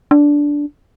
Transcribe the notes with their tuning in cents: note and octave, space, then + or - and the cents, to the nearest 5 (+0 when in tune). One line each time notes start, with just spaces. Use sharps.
D4 -10